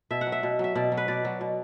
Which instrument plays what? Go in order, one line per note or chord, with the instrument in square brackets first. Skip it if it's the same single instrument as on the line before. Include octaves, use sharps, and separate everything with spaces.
[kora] B2 E5
F#5
F#3
E5
B2
F#3 E5
B2 D5
F#3
B4
B2 D5
F#3
B2